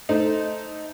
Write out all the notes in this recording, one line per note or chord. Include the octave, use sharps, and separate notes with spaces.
A3 D#4 C5